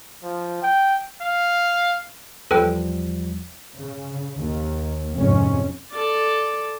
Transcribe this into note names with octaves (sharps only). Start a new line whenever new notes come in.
F3
G5
F5
E2 F3 G3 A4 B4 G5
C#3
D#2
F1 F2 G#2 C#4
A4 D5